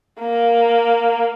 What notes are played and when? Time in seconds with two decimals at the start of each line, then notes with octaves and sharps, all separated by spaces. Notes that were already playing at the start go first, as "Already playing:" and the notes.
0.20 A#3